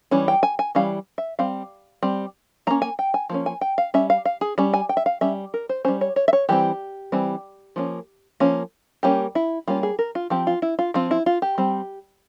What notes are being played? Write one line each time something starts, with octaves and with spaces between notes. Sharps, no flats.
E3 G3 C#4
G5
G#5
G#5
E3 G3 C#4 F5
E5
G3 C4 F5
G3 C4
F3 A#3 C#4 A#5
G#5
G5
G#5
F3 A#3 C#4
G#5
G5
F5
G3 C#4 E5
F5
F5
G#4
G3 C#4
G#5
G5
E5
F5
G3 C#4 E5
A#4
C5
G3 C#4 C5
C#5
C#5
E5
C#5
E3 G3 C4 G4
E3 G3 C4
F3 A#3 C#4
F3 A#3 C#4
G3 A#3 C#4 G4
E4
G3 A#3 C#4 F4
G#4
A#4
F4
F3 C4 G4
F4
E4
F4
F3 C4 F4
E4
F4
G4
G3 C4